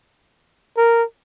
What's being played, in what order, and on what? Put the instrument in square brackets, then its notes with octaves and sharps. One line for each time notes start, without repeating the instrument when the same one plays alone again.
[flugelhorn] A#4